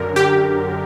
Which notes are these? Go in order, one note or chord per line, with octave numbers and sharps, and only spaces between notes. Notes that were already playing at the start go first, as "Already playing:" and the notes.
Already playing: F#2 D3 A#4
G4